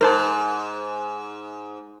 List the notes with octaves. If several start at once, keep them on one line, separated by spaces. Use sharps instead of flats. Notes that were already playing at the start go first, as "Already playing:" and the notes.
G#2 A#4 C5 A5